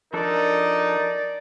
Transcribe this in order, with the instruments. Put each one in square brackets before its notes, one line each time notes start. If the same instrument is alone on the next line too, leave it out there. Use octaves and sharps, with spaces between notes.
[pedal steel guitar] F3 D4 A4 [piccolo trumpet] D#4 [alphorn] A#4 [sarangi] D5